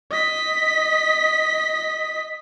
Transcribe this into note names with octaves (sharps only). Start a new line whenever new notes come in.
D#5 B6